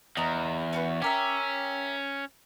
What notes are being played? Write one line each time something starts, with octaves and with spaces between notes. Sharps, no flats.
E2 D#5 A#5
C#4 F#4 B4
C#4 G4 A#4 E5